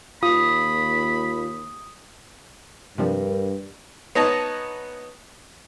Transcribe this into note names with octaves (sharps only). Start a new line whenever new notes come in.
D#2 F4 B5 D#6
G2 C3 F3 G3 D4 A#4
B3 D#4 C#5 D#5 A5